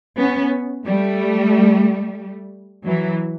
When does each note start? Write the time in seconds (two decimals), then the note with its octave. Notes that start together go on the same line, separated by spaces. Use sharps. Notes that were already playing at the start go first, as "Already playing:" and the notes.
0.17 B3 C#4
0.85 G3 A3
2.85 E3 F#3